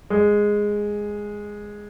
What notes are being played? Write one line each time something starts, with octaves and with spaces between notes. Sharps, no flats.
G#3